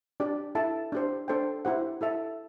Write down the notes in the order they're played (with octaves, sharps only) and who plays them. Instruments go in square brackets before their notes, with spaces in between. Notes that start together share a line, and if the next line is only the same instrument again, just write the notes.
[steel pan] D4 G4 D5
E4 A4 E5 A5
D4 G4 C5
D4 A4 C5 G5
E4 G4 C5 F#5
E4 A4 E5 A5